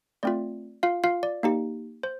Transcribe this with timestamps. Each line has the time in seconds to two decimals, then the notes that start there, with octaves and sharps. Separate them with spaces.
0.23 A3 C4 F4 D5
0.83 F4 F5
1.04 F4 F5
1.23 D5
1.43 A#3 D#4 G4
2.03 C5